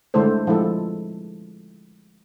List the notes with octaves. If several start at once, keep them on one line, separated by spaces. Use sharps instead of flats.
D3 G#3 A3 E4 A4 C5
F3 G#3 E4 A4